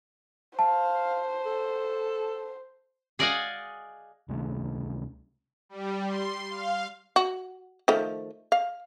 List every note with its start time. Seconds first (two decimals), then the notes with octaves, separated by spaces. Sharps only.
0.59 C5 F5 A5
1.46 A4
3.19 G#4 D5 D#5 F5 F#5 G#5
4.29 C#2 C3 A3 D4
5.69 G3
6.06 C6
6.50 F5
7.16 F#4
7.88 D#3 F3 A3
8.52 F5